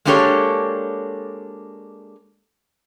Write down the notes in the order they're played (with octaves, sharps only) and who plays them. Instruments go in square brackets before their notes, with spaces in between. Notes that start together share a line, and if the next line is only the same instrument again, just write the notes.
[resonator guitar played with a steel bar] G#3 A#3 D4 G4 A4 C#5